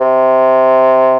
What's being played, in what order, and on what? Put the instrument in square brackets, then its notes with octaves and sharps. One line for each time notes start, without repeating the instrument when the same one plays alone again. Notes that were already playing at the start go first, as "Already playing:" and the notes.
[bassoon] C3